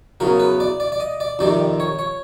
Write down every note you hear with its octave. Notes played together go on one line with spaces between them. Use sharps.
E2 C#3 F#3 A#4
B4
D5
D5
D5
D#5
D5
F2 C3 D#3 G3 D5
C#5
C#5